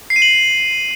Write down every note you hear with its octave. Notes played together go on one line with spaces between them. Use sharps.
C7
D#7
F#7